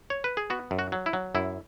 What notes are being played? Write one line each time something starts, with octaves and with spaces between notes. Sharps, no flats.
C#5
B4
G#4
B3 F#4
F#2
F#4
F#3
E4
F#3
F#2 E4